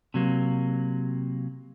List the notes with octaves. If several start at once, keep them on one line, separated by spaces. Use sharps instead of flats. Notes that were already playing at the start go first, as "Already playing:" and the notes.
C3 F#3 A#3